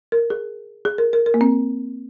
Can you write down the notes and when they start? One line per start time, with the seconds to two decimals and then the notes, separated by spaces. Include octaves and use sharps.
0.12 A#4
0.30 G#4
0.85 G#4
0.98 A#4
1.13 A#4
1.26 A#4
1.34 A#3
1.41 C4